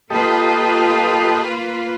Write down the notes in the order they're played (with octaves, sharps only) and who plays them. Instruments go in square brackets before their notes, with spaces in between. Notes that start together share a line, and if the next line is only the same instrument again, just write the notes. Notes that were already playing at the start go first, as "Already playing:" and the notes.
[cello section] A#3 F4 B4 [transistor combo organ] G4 A4 D#5